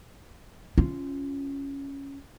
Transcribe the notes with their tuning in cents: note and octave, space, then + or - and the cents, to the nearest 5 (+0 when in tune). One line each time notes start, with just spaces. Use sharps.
C#4 +0 F4 -10